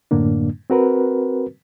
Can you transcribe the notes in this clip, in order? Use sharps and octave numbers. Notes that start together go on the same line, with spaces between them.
F#2 A2 D3 A#3 D4
C4 F#4 A#4 B4